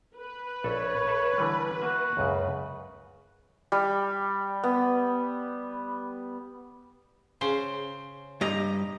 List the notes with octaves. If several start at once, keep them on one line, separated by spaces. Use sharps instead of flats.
B4
A#1 A4 C#5
A4 E5 A5
D3 E3 G3
A#3 F#4 E5
C#2 F#2 C#3
G3
B3
C#3 C5
G2 G4 D#5 A#5